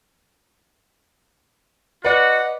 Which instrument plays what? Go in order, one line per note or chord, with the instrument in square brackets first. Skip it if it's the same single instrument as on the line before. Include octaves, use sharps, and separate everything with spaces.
[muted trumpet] F#4 [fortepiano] B4 D5 [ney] D#5 [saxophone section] F#5